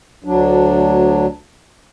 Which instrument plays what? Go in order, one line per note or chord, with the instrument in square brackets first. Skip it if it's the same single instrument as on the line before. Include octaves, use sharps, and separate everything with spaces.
[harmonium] D2 F#3 D4